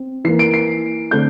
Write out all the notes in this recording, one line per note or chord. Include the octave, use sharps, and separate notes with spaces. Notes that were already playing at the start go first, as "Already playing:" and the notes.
Already playing: C4
E3 A#3 C7
D7
C7
D3 A3 C4 G6